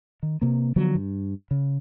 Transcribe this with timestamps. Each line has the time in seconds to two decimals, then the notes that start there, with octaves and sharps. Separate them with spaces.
0.23 D#3
0.42 C3 A#3
0.76 D3 F3 F#3 B3
0.95 G2
1.51 C#3